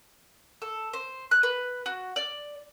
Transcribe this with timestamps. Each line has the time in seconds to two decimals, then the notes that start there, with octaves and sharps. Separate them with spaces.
0.62 A4
0.93 C5
1.31 F#6
1.43 B4
1.86 F#4
2.16 D5